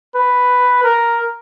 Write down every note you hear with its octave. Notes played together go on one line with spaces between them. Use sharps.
B4
A#4